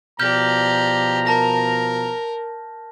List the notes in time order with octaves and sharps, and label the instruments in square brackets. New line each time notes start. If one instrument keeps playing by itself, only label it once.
[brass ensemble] B2 F3 A#5 [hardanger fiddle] G4 D5 [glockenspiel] F6 G6
[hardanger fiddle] A#4 [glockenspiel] A5 A#6